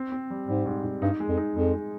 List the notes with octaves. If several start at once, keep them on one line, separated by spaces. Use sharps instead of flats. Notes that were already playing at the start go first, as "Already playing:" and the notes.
Already playing: C4
C4
G3
G#2 G3
G#2
G#2
G2 D#4
G#3
F2
D#4
F2 G#3
G#3